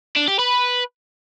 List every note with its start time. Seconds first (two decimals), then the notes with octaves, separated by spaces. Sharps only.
0.16 D4
0.28 G4
0.39 B4